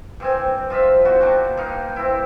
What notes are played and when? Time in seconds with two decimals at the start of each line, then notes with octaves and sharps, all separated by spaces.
0.20 G2 C4 G#5
0.70 F3 F4 D#5 E5
1.05 B3 F#4 C5
1.21 A#2 G3 D4
1.57 G2 D#4 F5
1.96 C4 E4